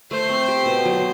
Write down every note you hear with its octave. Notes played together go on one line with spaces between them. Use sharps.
A3 C5
C4
G4
B2
F#3